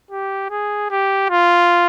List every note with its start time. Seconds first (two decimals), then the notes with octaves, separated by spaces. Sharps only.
0.11 G4
0.50 G#4
0.91 G4
1.30 F4